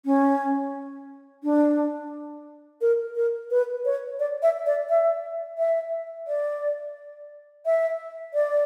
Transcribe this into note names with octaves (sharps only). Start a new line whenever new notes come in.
C#4
D4
A#4
A#4
B4
C#5
D5
E5
D5
E5
E5
D5
E5
D5